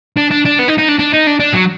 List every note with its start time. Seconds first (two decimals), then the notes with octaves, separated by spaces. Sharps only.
0.17 D4
0.31 D4
0.45 D4
0.59 B3
0.68 D#4
0.78 D#4
0.88 D4
0.99 D4
1.13 D#4
1.27 D4
1.40 D4
1.53 F#3